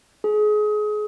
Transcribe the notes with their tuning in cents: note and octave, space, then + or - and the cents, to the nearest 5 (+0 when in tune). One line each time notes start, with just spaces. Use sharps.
G#4 +25